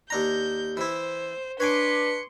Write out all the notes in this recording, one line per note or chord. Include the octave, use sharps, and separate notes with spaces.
D#2 D4 A#5 G6
E3 E4 C5
D4 B4 C#5 G#5 C6 D6 C#7